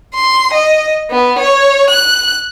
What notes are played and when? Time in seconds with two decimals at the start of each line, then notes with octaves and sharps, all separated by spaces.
0.14 C6
0.54 D#5
1.10 B3
1.39 C#5
1.90 F#6